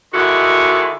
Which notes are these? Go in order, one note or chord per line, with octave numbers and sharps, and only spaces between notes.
D3 D#3 G#3 E4 F#4